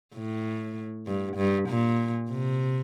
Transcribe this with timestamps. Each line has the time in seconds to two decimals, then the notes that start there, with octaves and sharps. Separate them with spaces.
0.14 A2
1.07 G2
1.37 G2
1.68 A#2
2.30 C3